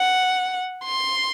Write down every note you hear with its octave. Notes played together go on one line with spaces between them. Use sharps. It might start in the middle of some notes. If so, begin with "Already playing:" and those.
Already playing: F#5
C6